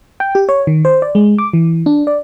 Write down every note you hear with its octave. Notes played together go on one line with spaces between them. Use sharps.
G5
G4
C#5
D#3
C5
D5
G#3
D6
E3
D4
D5